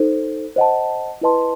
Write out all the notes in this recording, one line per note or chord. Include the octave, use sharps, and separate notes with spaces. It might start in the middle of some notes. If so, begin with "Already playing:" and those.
Already playing: D#4 A4 C5
C5 D#5 F#5 A5
E4 B4 D#5 A5 C6